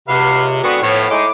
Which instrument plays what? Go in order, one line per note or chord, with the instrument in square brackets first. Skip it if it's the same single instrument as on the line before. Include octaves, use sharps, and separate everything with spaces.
[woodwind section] C#2 C3 [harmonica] F#4 B4 F5
[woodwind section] D3 F#4 [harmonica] G#3 B3 C4
[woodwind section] A2 [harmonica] F3 B3 C#5
[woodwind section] A2 E4 D6 [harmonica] G#3 D#4